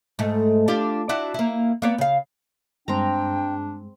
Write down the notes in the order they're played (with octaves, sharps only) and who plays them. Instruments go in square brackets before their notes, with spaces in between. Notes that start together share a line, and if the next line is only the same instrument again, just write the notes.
[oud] G#2 A3
D4 F4 G4
D4 E4 F#4
A#3 E4
A#3 B3 D5
C#3 F5
[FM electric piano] G2 G#3 G#4 [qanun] C4 A#5 [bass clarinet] D4 [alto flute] G5